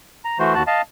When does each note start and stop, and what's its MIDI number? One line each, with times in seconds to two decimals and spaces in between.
0.25 0.38 82
0.39 0.55 52
0.39 0.55 57
0.39 0.55 66
0.39 0.55 72
0.55 0.63 39
0.55 0.63 66
0.55 0.63 81
0.55 0.63 90
0.67 0.82 75
0.67 0.82 77
0.67 0.82 81